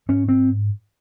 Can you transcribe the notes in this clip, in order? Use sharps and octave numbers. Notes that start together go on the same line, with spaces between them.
G#2 C#4
C4